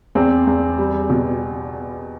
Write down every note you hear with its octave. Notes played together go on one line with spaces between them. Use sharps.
E2 C4
E2
G3
B2